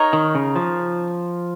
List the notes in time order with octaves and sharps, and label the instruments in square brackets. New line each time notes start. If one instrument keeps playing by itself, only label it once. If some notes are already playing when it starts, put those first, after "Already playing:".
Already playing: [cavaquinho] D#4 A#4 C#5
[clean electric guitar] D#3
C#3
F3